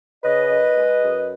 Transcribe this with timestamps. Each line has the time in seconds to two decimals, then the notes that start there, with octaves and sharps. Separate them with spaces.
0.24 C#3 B4 D#5
0.50 F#2
0.76 G#3
1.02 F#2